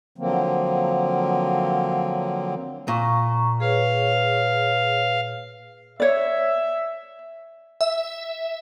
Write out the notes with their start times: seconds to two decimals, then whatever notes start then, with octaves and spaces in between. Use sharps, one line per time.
0.18 D3 F3 F#3 A#3 C4
2.88 A#2 A#5 C#6
3.60 G#4 B4 C#5 F5
6.00 C#5 D5 E5
7.81 E5